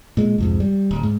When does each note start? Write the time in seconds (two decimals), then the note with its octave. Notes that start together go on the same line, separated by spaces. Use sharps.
0.17 A#2 G#3
0.38 C2 F2 G#2
0.60 G3
0.91 D1
1.03 G#2